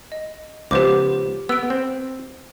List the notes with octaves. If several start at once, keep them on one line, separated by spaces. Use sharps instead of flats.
D#5
C#2 F3 B3 G4 C5 D6
B3 E6 D7
C4